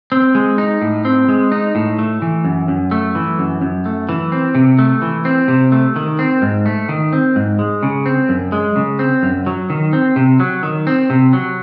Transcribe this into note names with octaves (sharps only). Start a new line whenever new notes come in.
C4
G#3
D#4
A2
C4
G#3
D#4
A2
A3
E3
F#2
F#2
A3
E3
F#2
F#2
A3
E3
C4
C3
A3
E3
C4
C3
A3
D#3
C4
G#2
A3
D#3
C4
G#2
G#3
C#3
C4
F#2
G#3
C#3
C4
F#2
F#3
D#3
C4
C3
F#3
D#3
C4
C3
F#3